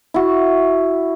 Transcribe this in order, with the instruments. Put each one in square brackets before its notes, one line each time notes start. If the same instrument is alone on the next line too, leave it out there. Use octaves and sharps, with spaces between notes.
[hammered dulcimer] E4 F#4